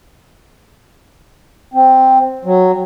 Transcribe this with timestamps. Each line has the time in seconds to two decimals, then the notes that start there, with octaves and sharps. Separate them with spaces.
1.74 C4
2.45 F#3